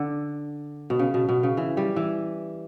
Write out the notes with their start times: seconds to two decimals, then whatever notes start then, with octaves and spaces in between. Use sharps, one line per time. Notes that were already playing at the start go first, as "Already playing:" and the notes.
Already playing: D3
0.90 B2
0.99 C#3
1.14 B2
1.29 B2
1.43 C#3
1.57 E3
1.77 G3
1.96 E3